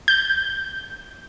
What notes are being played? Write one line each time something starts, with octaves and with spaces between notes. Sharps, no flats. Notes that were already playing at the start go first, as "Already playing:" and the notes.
G6